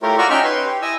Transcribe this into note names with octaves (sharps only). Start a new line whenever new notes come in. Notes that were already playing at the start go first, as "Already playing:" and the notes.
A3 E4 F4 G4 A#4 C#5
F4 F#4 D5 A#5 C#6
C#4 D#4 E5 G5 C#6 F6
B4 C#5 C6
G4
E4 D#5 G#5 E6